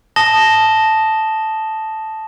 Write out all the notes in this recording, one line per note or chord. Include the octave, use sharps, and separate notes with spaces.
A5 D#6 A#6 E7 G7